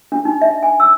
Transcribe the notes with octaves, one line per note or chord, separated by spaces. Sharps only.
D4
D#4
E5
G#5
E6